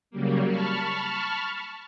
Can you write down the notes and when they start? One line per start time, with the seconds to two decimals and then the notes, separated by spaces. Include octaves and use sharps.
0.11 C#3 F#3 G3 A#3
0.46 A5 B5 C#6 F6